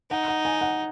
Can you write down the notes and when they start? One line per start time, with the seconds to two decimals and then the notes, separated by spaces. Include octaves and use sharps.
0.10 D#4 F#5
0.28 F#5
0.45 G#5
0.61 F#5